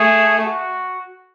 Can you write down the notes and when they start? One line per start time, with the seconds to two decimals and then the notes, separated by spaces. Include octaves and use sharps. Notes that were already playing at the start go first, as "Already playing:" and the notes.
Already playing: A3 G#4
0.45 F#4